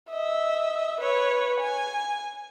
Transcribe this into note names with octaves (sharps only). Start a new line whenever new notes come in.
D#5 E5
B4 C#5
G#5